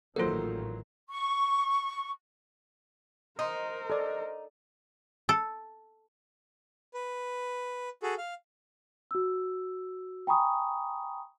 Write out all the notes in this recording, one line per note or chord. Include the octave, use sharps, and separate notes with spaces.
A1 A#2 D#3 F#3 F4 A4 A#4 C5
C#6
D#4 A#4 C5 C6 D#6
A4 D5
A4
B4
F#4 G#4 A4
F5
F#4 E6
G5 G#5 A#5 B5 C#6 D#6